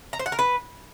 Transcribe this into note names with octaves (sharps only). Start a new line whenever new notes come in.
A#5
C5
F#5
A#4
B4